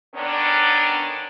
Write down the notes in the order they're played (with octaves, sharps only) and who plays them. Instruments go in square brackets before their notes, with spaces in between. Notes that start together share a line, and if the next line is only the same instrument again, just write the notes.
[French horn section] D3 D#3 B3 C#4 D4